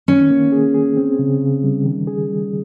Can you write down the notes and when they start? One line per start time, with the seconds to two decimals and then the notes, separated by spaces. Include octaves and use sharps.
0.08 D#3 C#4
0.30 A#3
0.52 G#4
0.74 G#4
0.97 C4
1.19 C#3
1.41 C#3
1.63 G3
1.85 D#3
2.07 G#4
2.30 G3